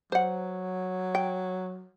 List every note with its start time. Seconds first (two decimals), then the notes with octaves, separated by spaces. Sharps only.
0.12 F#3 C5 F#5
1.15 G5